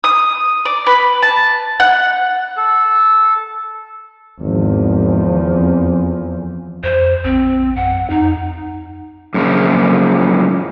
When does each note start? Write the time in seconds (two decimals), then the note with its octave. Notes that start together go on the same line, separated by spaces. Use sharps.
0.04 D#6
0.65 D5
0.87 B4
1.22 A5
1.80 F#5
2.57 A4
4.41 G#1 E2 F3
5.53 F2
6.83 F2 C5
7.24 A#1 C4
7.76 F#2 F#5
8.10 F2 D#4
9.34 F#2 A#2 C#3 F3